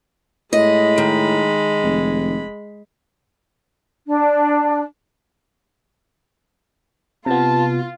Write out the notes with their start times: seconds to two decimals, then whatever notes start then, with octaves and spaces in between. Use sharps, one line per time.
0.53 A2 G#3 D#5 B5
0.98 D#3
1.83 F1
4.08 D4
7.26 C3 B3 F4 A5